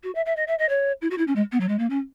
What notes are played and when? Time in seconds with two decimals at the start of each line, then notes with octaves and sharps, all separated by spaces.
0.03 F#4
0.15 E5
0.26 E5
0.36 D#5
0.47 E5
0.59 D#5
0.69 C#5
1.02 E4
1.10 F#4
1.18 E4
1.27 C#4
1.36 G#3
1.52 B3
1.60 F#3
1.69 G#3
1.79 A#3
1.90 C#4